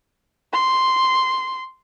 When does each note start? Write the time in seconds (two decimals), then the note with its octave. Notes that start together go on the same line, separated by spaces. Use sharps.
0.53 C6